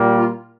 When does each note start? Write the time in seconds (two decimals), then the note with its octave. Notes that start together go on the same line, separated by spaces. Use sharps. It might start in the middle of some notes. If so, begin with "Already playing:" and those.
Already playing: A#2 G3 A#3
0.18 F4